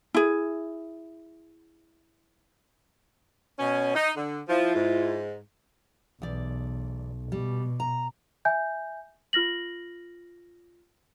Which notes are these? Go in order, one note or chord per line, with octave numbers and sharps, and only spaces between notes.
E4 G#4
B2 C#4
D#4
D3
F3 E4 F4
G#2
B1 E2 D5
B2 G3
A#5
E5 G#5 G6
F4 F6 A#6 F#7